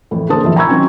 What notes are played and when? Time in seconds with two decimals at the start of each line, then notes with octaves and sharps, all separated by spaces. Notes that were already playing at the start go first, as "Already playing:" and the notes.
0.11 F2 A2 E3
0.29 D3 A#3 G#4 C5 A5 D#6
0.43 F1 E2 A2 F3 E5
0.56 G#5 A#5 B5 C#6 E6 G#6
0.69 D#3 F#3 C4 C#4 F#4